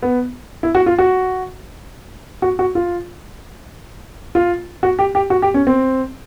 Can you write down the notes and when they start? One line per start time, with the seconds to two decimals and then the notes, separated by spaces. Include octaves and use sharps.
0.02 B3
0.63 E4
0.75 F#4
0.86 F4
0.99 F#4
2.42 F#4
2.59 F#4
2.75 F4
4.35 F4
4.83 F#4
4.99 G4
5.15 G4
5.30 F#4
5.42 G4
5.54 C#4
5.67 C4